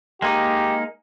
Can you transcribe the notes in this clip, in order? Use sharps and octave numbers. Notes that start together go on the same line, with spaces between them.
G#3 A#3 D#4 G4